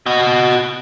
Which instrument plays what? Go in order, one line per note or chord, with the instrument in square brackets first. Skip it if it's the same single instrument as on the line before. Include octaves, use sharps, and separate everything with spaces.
[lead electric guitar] F#4 D#5